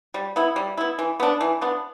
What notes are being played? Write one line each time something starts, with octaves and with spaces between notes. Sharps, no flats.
G3
B3 E4
G3
B3 E4
E3
B3 D4
E3
B3 D4